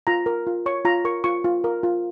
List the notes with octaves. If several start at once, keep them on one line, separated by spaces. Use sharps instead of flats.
F4 A#5
A#4
F4
C#5 C#6
F4 A#5
A#4 C#6
F4 C#6
F4
A#4
F4